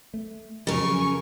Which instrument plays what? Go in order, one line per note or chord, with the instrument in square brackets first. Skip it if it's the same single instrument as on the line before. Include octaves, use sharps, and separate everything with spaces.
[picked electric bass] A3
[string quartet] F2 G#5 C#6 [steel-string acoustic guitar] C#3 A#4 [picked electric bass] F3 F#3